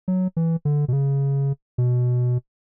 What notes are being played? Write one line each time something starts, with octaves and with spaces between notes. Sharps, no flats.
F#3
E3
D3
B2
C#3
B2